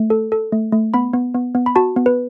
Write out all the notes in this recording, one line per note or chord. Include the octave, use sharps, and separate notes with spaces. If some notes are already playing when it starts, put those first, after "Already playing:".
Already playing: A3
A4
A4
A3
A3
B3 B5
B3
B3
B3
B5
F#4 A5
B3
B4